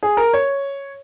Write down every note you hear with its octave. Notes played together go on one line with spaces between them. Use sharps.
G#4
A#4
C#5